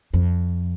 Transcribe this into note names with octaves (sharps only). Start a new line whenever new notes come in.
F2